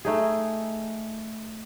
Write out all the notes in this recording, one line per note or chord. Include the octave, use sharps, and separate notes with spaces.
A3 D#4 G#4